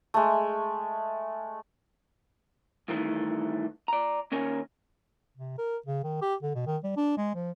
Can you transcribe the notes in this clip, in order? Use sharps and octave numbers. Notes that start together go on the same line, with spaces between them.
G#3 A3
G2 D#3 E3 G3 A3
D5 A#5
D#2 C#4 A#4 C#5 G#5
C3
A#4
C#3
D#3
G4
D3
B2
D#3
G3
D4
G#3
F3